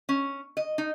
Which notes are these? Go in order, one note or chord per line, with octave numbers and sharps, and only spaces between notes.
C#4
D#5
D#4